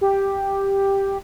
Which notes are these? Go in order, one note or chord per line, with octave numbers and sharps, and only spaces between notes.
G4